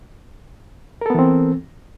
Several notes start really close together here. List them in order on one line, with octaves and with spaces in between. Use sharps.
A#4 A4 B3 E3 C4